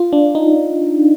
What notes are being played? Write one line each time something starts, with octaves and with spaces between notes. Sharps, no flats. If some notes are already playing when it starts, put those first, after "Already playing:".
Already playing: F4
D4
D#4